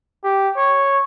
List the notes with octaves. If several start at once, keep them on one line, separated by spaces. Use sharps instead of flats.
G4
C#5